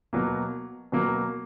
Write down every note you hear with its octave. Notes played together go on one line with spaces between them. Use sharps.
B2 F#3 A#3
B2 F#3 A#3